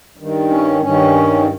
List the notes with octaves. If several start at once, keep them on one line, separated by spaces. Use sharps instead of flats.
G2 D#3
C#4
G2 D#3 C#4